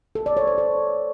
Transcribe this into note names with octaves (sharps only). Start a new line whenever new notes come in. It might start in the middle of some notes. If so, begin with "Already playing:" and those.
A4
D5
C#5
C5
A4